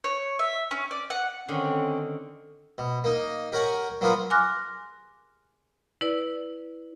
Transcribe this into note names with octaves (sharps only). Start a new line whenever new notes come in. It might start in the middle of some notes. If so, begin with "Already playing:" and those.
C#5
E5
C#4
D5
F#5
D3 D#3 C4 C#4
B2
A#3 D#4
G4 A#4 C#5 F#5 G#5
F#3 A#3 B3 F4 A#4
G#5 C6 D6 F6 F#6 A#6
E4 B4 D5